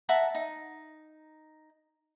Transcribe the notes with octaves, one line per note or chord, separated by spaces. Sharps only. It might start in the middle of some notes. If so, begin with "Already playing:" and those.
E5 F#5 A5 A#5
D#4